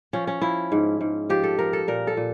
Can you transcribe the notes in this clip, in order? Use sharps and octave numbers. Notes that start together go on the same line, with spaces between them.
F3 C#4
C#4
F3 E4
G#2
G#2
F3 G4
A4
F3 A#4
A4
A#2 A#4
A4
A#2